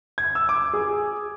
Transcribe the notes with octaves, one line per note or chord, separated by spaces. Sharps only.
G#6
E6
D6
G#4